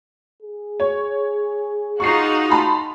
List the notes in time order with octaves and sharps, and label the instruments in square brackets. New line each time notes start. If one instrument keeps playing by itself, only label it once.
[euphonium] G#4
[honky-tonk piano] C#5
[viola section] D#4 F4 F#4 [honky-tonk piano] C#6 C7
[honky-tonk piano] A5 B5 C6